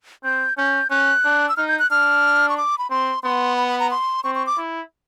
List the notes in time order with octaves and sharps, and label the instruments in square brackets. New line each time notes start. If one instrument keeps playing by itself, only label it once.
[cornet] C4 [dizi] G6
[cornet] C#4 [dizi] G6
[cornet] C#4 [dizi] F#6
[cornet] D4
[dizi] E6
[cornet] D#4 [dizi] F6
[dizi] G6
F#6
[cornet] D4 [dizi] F6
[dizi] C#6
D6
B5
[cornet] C4 [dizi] C6
[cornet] B3 [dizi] C6
[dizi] B5
B5
A#5
C6
[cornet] C4 [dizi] C#6
[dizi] C#6
D6
[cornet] E4